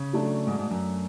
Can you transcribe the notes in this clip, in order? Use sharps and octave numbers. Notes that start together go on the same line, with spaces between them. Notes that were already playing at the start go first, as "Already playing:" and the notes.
Already playing: C#3
F#3 A3 D4 A4
G#2
G#2
F#2